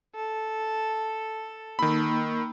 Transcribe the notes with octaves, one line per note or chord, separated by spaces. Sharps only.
A4
D#3 A#3 D#4 B5 E6